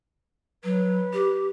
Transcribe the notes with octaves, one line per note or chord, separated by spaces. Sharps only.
F#3 B4
G4